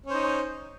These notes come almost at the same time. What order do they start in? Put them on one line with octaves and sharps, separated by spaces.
C#4 C5 D#4